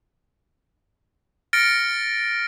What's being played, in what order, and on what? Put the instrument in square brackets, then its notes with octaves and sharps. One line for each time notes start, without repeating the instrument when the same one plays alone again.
[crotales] F6 A6 A#6 C#7 D7